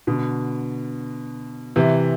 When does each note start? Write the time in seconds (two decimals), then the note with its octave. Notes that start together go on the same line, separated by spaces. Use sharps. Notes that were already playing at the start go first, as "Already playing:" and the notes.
0.07 B2 D3
1.76 C3 E3